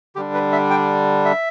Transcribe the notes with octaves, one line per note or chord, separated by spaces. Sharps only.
D3 G3 D4 G4
B4
E5
G5
E5